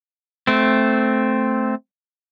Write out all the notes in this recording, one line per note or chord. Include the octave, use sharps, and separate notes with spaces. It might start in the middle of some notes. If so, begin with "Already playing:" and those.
A3 C4